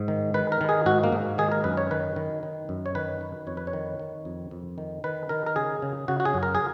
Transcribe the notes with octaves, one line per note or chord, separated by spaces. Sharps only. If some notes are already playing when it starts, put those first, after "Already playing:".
Already playing: G#2
D#3
D#3 B4
A#4
D#3
G#4
G#2 F#4
A#3
G#2
D#3 G#4
A#4
F#2 B4
C#5
D#3 B4
D#3
D#3
F#2
C#5
D#3 B4
D#3
F2 C#5
B4
C#5
D#3
D#3
F2
F2
D#3
D#3 B4
D#3 A#4
A#4
C#3 G#4
C#3
C#3 F#4
F#4
G#4
F#2
A#4
G#4